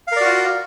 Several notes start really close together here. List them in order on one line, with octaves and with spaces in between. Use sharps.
F5 A#4 D5 F#4 F4